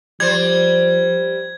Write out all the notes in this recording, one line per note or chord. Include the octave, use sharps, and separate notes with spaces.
F3 G3 C5 G#6